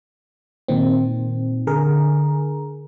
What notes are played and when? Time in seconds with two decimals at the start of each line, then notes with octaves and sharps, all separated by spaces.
0.68 A#2 D#3 C4
1.67 D3 G#4 A#4